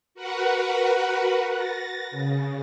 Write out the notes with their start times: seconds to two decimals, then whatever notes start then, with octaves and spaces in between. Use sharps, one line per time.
0.14 F#4 A#4 B4 F#5
1.51 A6 A#6
2.11 C#3